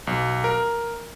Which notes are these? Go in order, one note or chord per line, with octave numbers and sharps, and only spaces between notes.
B1
A#4